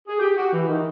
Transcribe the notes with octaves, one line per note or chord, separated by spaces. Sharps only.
G#4
G4
F#4
E3
D#3